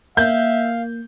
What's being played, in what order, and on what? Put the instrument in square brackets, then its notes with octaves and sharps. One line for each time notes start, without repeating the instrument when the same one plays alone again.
[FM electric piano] A#3 [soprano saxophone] E5 [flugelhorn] F5 [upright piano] G6